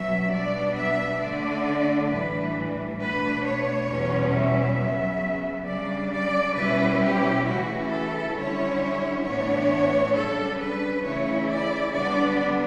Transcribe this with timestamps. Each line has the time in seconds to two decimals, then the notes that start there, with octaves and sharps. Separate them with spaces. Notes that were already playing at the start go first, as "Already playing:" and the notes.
Already playing: B2 F#3 C#4 E5
0.31 B2 G3 B3 D4 D5
0.75 E5
1.20 D3 A3 D4 D5
2.09 A2 E3 G3 D4 B4
2.99 B2 A3 D4 B4
3.44 C#5
3.89 E2 B2 G3 C#4
4.33 E5
4.78 C#3 F#3 B3
5.67 C#3 G3 D4 D5
6.13 D5
6.57 B2 G3 C#4 E4 B4
7.02 G4
7.46 C#3 E3 A3 E4 F#4
7.91 A4
8.35 D3 G3 C#4 E4 C#5
9.25 A2 E3 B3 D4 C#5
10.15 C#3 G3 D4 A4
10.60 B4
11.04 C#3 E3 A3 E4 C#5
11.49 D5
11.93 D3 G3 B3 D4 D5